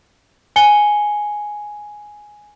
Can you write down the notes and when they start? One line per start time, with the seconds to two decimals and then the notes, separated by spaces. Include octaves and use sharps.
0.56 G#5 C#7 G7